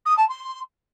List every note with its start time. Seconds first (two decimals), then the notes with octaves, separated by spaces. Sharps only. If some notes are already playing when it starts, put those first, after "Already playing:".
0.06 D#6
0.17 A5
0.29 C6